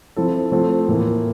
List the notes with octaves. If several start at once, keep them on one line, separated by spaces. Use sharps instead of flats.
F3 C4 E4 A4
F3 A3 C4 F4 A4
A2 E3 A#3